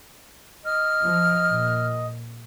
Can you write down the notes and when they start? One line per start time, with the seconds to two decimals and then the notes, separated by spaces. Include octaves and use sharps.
0.65 D#5 F6
1.00 F3
1.48 A#2